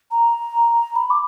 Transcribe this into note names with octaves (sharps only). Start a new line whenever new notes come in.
A#5
B5
D6